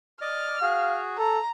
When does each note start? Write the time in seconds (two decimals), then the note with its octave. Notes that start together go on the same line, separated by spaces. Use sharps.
0.21 D5 D#5 D6 F6
0.62 F#4 G#4 F5
1.18 A4 A#5